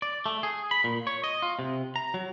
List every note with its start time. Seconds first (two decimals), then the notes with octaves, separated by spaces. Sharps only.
0.02 D5
0.26 A3
0.43 G#4
0.71 B5
0.84 A#2
1.07 C#5
1.24 D#5
1.42 F4
1.59 C3
1.96 A#5
2.14 F#3